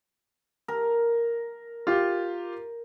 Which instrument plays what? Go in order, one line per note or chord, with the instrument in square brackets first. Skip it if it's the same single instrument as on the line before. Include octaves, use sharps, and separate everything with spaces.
[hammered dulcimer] A#4
[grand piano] F4 G4